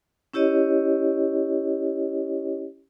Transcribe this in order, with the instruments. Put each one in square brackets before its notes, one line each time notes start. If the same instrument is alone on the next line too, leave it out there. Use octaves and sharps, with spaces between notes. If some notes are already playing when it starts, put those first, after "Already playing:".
[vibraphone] C#4 E4 G4 C#5 D#5